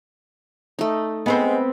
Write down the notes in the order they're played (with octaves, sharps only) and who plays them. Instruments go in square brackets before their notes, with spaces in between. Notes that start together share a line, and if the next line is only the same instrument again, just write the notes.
[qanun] A3 D#4
[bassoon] G#3 [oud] B3 C4 C5